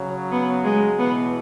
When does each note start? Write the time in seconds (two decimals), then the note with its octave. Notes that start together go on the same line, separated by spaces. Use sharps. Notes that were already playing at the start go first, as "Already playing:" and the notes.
Already playing: C#3 F#3
0.32 B3
0.65 G#3
0.99 B2 E3 B3